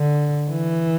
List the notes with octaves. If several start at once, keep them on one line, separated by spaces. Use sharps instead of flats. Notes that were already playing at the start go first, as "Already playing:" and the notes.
Already playing: D3
E3